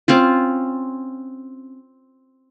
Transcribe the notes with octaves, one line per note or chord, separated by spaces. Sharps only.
C4 C#4 F4